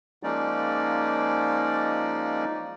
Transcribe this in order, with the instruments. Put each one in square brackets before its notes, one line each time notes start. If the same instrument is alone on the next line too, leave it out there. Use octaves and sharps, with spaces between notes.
[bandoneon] F3 G#3 A#3 C#4 D#4 D5